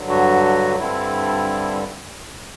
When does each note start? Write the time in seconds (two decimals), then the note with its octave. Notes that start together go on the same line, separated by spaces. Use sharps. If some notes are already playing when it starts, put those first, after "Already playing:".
Already playing: G2 D3 F#3
0.10 F#4
0.79 G2 D3 G3 C4 E4